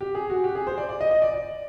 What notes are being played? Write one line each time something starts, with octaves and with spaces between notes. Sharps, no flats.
G4
G#4
F#4
G4
G#4
C5
D5
D5
D#5
D#5
D5
D5